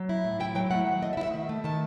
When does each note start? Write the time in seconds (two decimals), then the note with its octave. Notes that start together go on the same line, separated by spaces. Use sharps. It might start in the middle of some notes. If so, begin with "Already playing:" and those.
Already playing: F#3
0.09 E4
0.25 A2
0.40 E4 G5
0.55 F#3 G5
0.71 A3 F#5
0.87 D#3
1.02 A3 D#5
1.13 E5
1.17 E4
1.23 E5
1.34 D#3
1.49 A3
1.64 D#3 A5